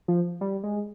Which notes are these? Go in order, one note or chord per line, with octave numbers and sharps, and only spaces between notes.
F3
G3
G#3